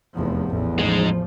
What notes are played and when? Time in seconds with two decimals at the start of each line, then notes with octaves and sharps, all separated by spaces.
0.14 F1 E2 F3
0.50 A1 E2 A2
0.79 F3 G#3 D#4